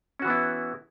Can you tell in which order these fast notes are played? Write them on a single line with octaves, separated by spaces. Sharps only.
C#4 F#4 E3 B3 E4